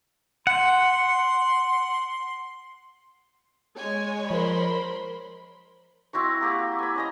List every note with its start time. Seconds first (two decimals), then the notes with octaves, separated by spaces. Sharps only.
0.47 F#5 C6
3.77 G#3 C#5 G#5
4.31 F3 A#4 C5 B5 C6
6.13 C4 E4 F#4 C#6
6.41 A#3 G4 F#5
6.79 G#5 B5
6.96 C#4 D#5 A#5